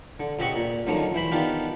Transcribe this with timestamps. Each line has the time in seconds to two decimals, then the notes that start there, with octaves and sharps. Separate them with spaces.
0.20 D3
0.39 C#2 C4 G4 D#5 F#5 C#6
0.56 A#2
0.87 C#2 D3 D#3 F3 F#3
1.14 E3 C5 B5 C6
1.32 D#3 B3 D4 F4 G4